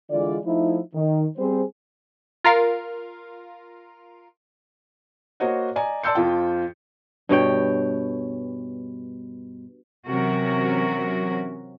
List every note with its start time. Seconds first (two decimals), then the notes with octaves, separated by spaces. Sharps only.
0.11 D3 E3 G#3 F4 D5
0.45 F3 A3 D#4 E4
0.95 D#3
1.37 G3 C4 G#4 C5
2.44 F4 A#4 F5
5.40 A#3 F#4 C5 C#5 D#5 F#5
5.76 D5 D#5 G#5 A#5
6.03 D5 A5 C6 E6 G6 C#7
6.15 F2 F3 F4 G5
7.29 G2 B2 C#5 G5
10.07 C3 E3 F#3 C#4 F#4 A#4